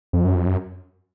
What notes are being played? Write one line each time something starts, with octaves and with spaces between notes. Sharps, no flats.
F2
F#2
F2
F#2